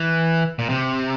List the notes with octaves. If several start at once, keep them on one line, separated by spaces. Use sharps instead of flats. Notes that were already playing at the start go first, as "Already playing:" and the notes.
Already playing: E3
A#2
C3